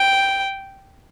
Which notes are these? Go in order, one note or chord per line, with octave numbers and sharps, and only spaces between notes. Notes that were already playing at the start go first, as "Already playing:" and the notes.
Already playing: G5